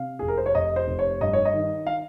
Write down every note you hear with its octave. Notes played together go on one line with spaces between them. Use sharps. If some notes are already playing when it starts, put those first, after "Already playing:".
Already playing: C3 F5
F1 G#4
A#4
C5
C#5
F1 D#5
C5
F1
C#5
G2 D#5
C#5
D#5
D#3
F5